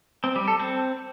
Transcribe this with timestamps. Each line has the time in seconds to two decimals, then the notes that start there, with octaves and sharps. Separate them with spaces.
0.24 C4
0.36 G3
0.48 A4
0.60 C4